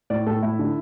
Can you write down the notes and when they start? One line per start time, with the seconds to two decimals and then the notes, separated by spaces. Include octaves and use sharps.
0.10 A2 D5
0.27 A2 A4
0.43 A2 E4
0.59 D3